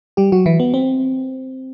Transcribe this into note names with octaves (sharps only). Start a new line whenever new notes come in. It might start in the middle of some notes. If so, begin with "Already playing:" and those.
G3 G4
F#3 F#4
E3 E4
B3
C4